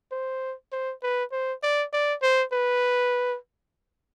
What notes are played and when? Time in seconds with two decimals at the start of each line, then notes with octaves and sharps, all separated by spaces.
0.12 C5
0.72 C5
1.03 B4
1.32 C5
1.63 D5
1.93 D5
2.22 C5
2.53 B4